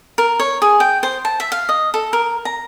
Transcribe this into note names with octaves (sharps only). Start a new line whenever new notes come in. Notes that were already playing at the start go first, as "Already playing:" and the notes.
A#4
C#5
G#4
G5
C5
A5
E5
F5
D#5
A4
A#4
A#5